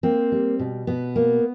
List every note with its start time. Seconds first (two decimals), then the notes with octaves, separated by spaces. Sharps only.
0.03 A#3 C4
0.32 G3
0.59 B2
0.87 B2 B3
1.16 A#3